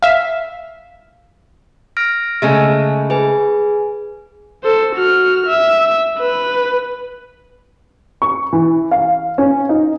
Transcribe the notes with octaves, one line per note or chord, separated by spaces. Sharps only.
E5 F5
F6 A#6 D7
C#3 G#3 A3
G#4 B4 G#5
A4 C5
F#4 F6
E5
B4
C#6
E3
F5
C#4
D#4